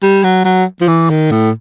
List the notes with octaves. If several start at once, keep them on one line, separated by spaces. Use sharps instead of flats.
G3
F#3
F#3
F3
E3
D#3
A2